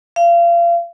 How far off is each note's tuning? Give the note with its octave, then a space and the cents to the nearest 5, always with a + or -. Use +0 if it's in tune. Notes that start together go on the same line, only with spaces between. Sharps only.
F5 -35